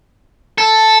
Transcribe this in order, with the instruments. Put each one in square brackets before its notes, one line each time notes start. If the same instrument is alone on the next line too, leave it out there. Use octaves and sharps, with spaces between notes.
[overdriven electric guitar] A4